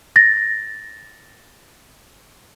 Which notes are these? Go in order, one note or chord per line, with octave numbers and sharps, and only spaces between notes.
A6 A#6